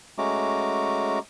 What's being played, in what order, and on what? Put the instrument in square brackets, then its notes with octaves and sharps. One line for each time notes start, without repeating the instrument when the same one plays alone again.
[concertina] G#3 A3 C#4 F#4 A#5 D6